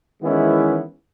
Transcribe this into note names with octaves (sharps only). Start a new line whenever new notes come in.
D#3 E3 G#3 B3 C#4 E4